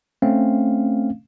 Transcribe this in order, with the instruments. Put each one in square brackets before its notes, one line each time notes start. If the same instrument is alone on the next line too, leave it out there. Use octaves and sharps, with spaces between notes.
[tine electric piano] A3 C4 C#4 F5